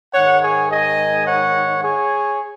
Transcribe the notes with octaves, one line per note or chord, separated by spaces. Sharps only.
G#2 D#3 G#3 C#5 F#5
G#4 C#5
D#5 G#5
C#5 F#5
G#4 C#5